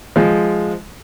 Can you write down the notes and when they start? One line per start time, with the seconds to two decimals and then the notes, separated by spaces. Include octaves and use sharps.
0.16 F3 G#3